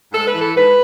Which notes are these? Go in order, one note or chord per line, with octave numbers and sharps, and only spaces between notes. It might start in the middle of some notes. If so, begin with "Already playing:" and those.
G#2 A4
B4
E3
A4
G#2 B4